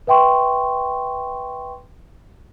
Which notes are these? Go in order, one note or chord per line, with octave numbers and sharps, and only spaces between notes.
B4 E5 G5 C6 C#6